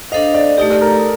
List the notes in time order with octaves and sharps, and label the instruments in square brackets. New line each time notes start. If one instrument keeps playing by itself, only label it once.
[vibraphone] D4 A4 C5 F5 [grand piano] D#5
[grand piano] D5
[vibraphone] A3 D#4 G4 [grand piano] D5
[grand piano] A4
A#4